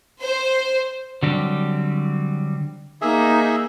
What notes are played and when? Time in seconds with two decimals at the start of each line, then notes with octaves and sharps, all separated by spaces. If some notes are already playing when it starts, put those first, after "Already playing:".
0.20 C5
1.23 D3 F#3 G3 C4 G4
3.02 A#3 D#4 G#4 E5